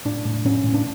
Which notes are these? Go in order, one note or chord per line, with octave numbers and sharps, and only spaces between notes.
A2 D4
A2
A2 C#4
A2
D4